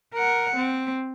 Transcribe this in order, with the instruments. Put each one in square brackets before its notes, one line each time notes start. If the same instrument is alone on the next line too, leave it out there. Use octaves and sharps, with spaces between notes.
[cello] A#4 F#5
C4